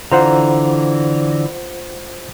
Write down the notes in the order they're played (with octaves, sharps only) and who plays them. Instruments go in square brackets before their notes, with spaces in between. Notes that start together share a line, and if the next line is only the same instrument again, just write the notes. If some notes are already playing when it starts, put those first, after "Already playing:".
[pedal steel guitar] D3 E3 A#5 [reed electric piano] F4 C5 F#5